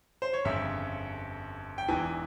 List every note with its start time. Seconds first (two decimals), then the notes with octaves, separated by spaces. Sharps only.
0.22 C5
0.33 C#5
0.45 G1 F2 C#3 E5
1.78 G5
1.88 E1 E2 E3 G#5